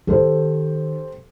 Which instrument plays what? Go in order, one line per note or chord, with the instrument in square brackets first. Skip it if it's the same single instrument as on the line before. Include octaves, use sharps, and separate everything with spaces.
[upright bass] D#3 [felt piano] G4 A4 C5